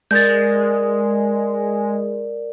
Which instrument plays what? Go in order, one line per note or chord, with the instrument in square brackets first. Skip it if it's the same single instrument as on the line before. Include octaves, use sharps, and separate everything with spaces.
[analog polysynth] G#3 [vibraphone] A#4 D5 [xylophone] G6 A6